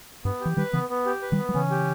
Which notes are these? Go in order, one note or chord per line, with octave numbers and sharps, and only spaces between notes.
G2 B3
G4
E3
D#3 G3 B4
C#3 E3 B3
B3
G4
B4
D#3 G3
B3
G3
C#3 E3 C#4
G4